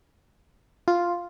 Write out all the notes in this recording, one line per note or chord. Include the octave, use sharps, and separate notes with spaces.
F4